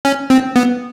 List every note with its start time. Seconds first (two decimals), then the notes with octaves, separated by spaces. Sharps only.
0.05 C#4
0.30 C4
0.56 B3